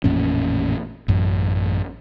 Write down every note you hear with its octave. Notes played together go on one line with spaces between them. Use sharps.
A1 F2 A#2 C#4
A1 F#2